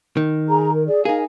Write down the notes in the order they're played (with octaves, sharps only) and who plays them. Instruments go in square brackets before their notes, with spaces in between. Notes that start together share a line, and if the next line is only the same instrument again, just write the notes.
[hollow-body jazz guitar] D#3
[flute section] G#4 G#5 A#5
A#4
G#4 D5
[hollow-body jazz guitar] D#4 G#4 [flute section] A#4 F5 G#5